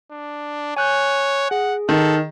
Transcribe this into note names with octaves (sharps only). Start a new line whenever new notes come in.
D4
C#5 G#5 F#6 G6
G#4 F#5
D#3 A4